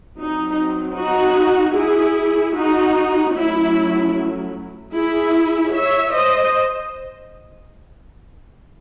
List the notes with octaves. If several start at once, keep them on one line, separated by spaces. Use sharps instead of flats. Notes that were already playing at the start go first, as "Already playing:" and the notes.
F#3 C4 D#4
D#4 F#4
E4 G#4
D#4 F#4
F#3 A3 C#4 E4
E4 G#4
C#5 E5
C5 D#5